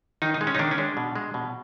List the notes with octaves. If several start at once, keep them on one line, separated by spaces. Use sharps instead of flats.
D#3 D#4
D#4
G#3
C#4
D#4
D#3 D4
C#4
G#3 D4
B2
G#3
B2